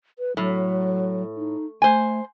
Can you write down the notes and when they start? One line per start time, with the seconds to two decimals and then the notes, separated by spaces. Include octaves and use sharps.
0.19 B4
0.37 A2 F#3
1.36 D#4
1.82 A3 C5 G#5